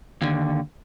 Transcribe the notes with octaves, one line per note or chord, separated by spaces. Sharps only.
D#2 D3